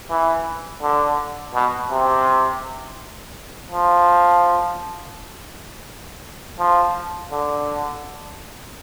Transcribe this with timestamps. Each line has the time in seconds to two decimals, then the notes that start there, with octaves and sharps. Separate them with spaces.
0.10 E3
0.82 D3
1.54 B2
1.91 C3
3.71 F3
6.59 F3
7.32 D3